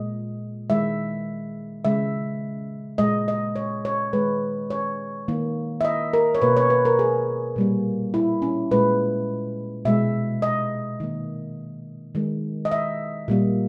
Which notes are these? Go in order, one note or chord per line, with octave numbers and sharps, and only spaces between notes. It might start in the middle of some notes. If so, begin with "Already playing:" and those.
Already playing: A#2 G#3 D#5
D#3 G#3 E5
C#3 G#3 E5
A#2 G#3 D#5
D#5
C#5
C#5
D#3 G#3 B4
C#5
D#3 A#3
E5
D#5
A#4
C#5
B2 A#3 B4
C#5
B4
A#4
G#4
A#2 G3 A#3
E4
C#4
A#2 G#3 B4
B2 G#3 E5
D#5
D#3 A#3
D#3 G#3
D#5
E5
A#2 G3 A#3